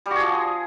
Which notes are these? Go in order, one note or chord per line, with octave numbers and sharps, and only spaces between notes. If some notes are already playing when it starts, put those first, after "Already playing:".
G3
F#4
G#4
F3